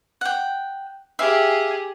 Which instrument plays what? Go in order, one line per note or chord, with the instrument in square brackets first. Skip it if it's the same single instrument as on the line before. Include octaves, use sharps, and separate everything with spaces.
[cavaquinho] F#5 G5
[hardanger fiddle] G4 G#4 [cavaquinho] E5 F5